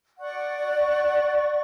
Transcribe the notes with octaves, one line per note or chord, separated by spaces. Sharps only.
D5 F#5 C#6